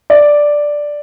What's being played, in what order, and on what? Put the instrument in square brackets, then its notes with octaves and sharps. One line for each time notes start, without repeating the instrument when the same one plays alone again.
[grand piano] D5